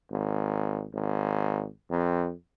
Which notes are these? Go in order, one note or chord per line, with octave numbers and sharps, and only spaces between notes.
G#1
G#1
F2